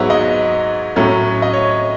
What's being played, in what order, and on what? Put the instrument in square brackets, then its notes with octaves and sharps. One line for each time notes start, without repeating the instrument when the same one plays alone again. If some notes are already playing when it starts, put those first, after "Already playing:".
Already playing: [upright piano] G#2 F#3 B3 C#5 E5
D#5
A2 F#3 A3 C#4
D#5
C#5